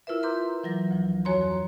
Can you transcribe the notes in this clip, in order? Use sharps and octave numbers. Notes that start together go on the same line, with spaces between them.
E4 F4 A#4 B4 E5
B4 A#5 C6 D6 G6
E3 F#3 A#6
D2 F3
F2 F#4 C#5 A#5 C6